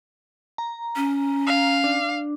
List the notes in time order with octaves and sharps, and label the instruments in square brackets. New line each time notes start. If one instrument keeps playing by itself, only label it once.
[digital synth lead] A#5
[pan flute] C#4
[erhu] F5
[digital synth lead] D4